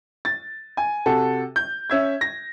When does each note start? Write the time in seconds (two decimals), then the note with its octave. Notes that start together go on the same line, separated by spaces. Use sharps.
0.25 A6
0.77 G#5
1.06 C3 F#4 A4
1.56 G6
1.90 C#4 E5 G#6
2.21 A#6